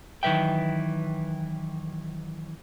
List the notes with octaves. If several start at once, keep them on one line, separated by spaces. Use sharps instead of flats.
D#3 E3 F#3 B4 E5 G5